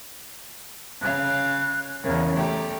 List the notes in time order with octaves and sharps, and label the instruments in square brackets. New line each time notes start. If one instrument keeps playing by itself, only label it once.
[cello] C#3 F5 [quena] F#6
[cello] E2 C#3 [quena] A#4
[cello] A3 G4 [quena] A#5